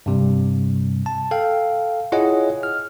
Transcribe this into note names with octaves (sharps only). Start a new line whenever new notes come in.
G2 C3 G3
A5
A4 F5 G5
E4 F4 G#4 C#5 D#5 F#5
F6